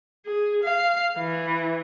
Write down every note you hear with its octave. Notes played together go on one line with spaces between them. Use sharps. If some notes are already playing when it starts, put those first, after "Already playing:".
G#4
F5
E3